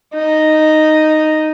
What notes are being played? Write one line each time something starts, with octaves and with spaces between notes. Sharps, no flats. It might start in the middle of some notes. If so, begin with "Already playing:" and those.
D#4